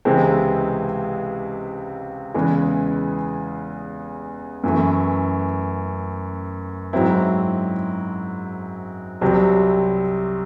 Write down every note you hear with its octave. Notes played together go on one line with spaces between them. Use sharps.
C#2 C3 E3 G#3 C4
E2 C#3 E3 G#3
F#2 E3 A3
G#2 F#3 C4 E4
C2 C3 F#3 C4